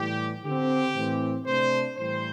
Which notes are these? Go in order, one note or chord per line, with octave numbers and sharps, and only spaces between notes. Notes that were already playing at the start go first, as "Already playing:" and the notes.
Already playing: A2 E3 G3 G4
D3 C4 G4
A2 E3 C4
C3 A3 D4 C5
A2 E3 G3 C5